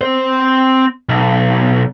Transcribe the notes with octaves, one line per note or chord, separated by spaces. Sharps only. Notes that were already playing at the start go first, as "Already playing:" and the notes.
C4 C5
B1